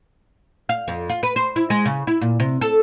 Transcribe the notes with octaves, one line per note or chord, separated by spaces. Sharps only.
F5
F2
F4
B4
C5
E4
G#3
C#3
E4
A#2
C3
A4